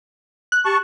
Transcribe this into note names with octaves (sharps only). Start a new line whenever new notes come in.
F#6
G4 A5 C#6